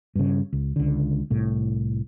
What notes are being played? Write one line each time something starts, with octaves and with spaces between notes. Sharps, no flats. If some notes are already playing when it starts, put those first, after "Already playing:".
G2 C#3
C#2
C#2 D3
C2 A2